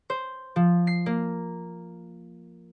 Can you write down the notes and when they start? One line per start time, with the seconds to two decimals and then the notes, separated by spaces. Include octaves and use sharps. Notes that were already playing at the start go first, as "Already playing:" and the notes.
0.10 C5
0.56 F3
0.87 C7
1.06 A#3